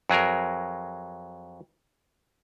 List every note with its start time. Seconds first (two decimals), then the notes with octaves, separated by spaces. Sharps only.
0.10 F2 F#3 G#4 A#4